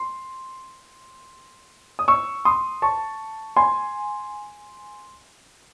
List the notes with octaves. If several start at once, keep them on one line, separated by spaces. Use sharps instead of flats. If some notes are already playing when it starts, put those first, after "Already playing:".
Already playing: C6
D#6
C#6 E6
C6 D#6
A5 C#6
G#5 C6